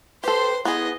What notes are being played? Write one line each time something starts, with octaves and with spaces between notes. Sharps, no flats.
G4 A4 B4 C5 C6
B3 E4 G#4 D#5